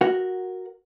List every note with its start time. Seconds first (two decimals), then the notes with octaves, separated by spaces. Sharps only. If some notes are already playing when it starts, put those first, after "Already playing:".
0.01 F#4 A#4 F#5